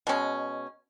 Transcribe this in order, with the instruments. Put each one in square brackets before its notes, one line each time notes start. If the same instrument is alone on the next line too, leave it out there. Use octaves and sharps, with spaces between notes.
[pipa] B2 G#3 C#4